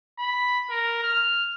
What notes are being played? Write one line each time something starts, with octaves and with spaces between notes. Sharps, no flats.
B5
A#4
F6